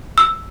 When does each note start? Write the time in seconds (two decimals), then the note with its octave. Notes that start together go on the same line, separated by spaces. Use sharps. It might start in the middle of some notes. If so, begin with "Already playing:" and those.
0.18 E6